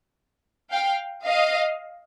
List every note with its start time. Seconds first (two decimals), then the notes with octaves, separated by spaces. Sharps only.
0.72 F5 G5
1.25 D#5 F5